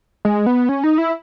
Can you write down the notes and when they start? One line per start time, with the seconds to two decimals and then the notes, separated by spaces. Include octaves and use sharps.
0.25 G#3
0.46 B3
0.69 C#4
0.84 D#4
0.98 E4